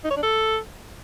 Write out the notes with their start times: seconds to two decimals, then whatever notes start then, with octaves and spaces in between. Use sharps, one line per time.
0.04 D#4
0.11 C#5
0.17 D4
0.23 A4